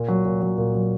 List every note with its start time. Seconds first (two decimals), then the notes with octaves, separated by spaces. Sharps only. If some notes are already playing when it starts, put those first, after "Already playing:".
Already playing: A#2
0.08 F#3
0.25 A#2
0.42 F#3
0.58 A#2
0.74 F#3